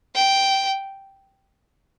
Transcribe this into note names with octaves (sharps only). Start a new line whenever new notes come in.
G5